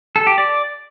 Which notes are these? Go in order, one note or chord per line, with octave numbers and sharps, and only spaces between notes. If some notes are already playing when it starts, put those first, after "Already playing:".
A4
G4
D5